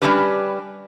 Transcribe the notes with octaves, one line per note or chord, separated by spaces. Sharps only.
G3 G#3 C#4 D4 G4 B4